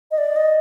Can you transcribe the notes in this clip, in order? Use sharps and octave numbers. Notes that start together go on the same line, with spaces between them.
D#5
D5
D#5